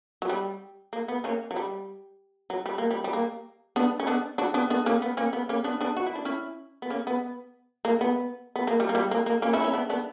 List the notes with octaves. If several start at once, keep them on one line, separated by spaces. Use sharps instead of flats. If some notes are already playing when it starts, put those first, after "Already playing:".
F#3
G3
A#3
B3
A#3 C#4
F#3
G3
F#3
G3
A#3
G3
G3
A#3
B3 D4
C#4
B3 D4
D4 F#4
B3 D4
B3 D4
A#3 C#4
B3
A#3 C#4
B3
A#3 C#4
B3 D4
B3 D4
F#4
E4
D4
C#4 E4
B3
A#3 C#4
B3
A#3
B3
B3
A#3
G3
A#3
G3
A#3
A#3
A#3 C#4
C#4 E4
C#4 E4
B3 D4
B3 D4